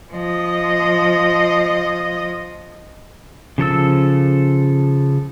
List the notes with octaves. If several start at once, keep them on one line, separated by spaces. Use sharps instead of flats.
F3 D#5
C#3 F3 A4 E6